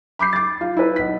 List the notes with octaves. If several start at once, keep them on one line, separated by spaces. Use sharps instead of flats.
B5 D6 G6 C7
D6 A6
F4
E4 B4
B1 B6